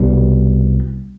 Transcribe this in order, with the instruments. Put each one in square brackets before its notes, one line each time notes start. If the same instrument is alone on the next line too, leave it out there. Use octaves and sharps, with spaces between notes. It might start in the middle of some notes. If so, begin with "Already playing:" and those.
Already playing: [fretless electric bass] C2 B2 G3